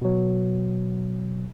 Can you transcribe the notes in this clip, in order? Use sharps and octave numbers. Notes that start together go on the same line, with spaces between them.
B2 F#3